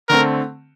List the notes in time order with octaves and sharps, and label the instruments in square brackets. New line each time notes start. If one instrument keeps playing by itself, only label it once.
[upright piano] D3 A3 C4 [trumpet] A#4